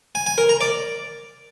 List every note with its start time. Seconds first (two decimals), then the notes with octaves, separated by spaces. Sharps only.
0.15 G#5
0.26 G#5
0.38 A#4
0.49 A#5
0.61 D5